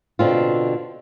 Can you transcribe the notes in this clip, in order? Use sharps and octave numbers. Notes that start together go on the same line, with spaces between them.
B2 D3 C4 F4